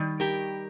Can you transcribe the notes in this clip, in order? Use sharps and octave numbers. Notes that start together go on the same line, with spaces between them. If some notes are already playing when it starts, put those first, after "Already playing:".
Already playing: D#3 G3
G4 A#4